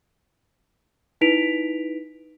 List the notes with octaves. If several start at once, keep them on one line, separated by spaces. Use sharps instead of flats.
D#4 E4 B4 B6 D7 F7